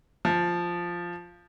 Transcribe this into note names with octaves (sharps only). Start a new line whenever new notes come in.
F3